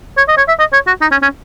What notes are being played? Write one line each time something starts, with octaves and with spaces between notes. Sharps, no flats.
C#5
D#5
C#5
E5
D#5
C#5
F#4
D#4
C#4
C#4